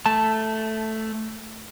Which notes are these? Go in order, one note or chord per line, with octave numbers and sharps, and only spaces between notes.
A3 A5